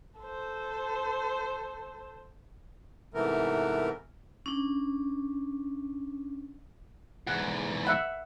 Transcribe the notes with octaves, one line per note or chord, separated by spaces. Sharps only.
A4 C5
G#2 C3 E3 A3 B3 A#4
C#4 D4
E2 G#2 F#5
E5 F#5 B5